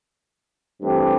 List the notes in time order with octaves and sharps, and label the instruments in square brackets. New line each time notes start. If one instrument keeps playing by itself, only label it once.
[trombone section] G2 E3 A3 C4 G4